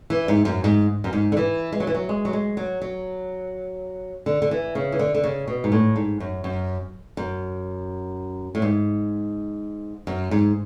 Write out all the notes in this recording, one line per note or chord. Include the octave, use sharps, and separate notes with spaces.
E3
G#2
F#2
G#2
F#2
G#2
D3
E3
G#3
F#3
E3
F#3
G#3
F#3
G#3
F#3
F#3
D3
D3
E3
C#3
E3
D3
D3
C#3
B2
G#2
A2
G#2
F#2
F#2
F#2
A2
G#2
F#2
G#2